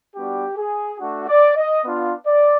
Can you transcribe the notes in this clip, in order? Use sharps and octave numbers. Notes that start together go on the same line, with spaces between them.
G3 B3 D4 F#4 G4
G#4
A3 D4 F#4
D5
D#5
B3 D4 F4
D5